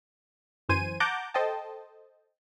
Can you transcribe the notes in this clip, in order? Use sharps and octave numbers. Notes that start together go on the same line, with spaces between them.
G1 F#2 E3 C5 G#5 D#7
F#5 A5 A#5 D6 G6
A4 C5 D#5 G5 A5